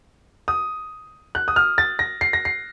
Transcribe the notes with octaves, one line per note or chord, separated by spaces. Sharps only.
D#6
F#6
D#6
F6
A6
A#6
C7
A#6
C7